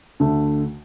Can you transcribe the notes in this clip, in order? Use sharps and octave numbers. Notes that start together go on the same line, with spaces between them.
D2 D3 A3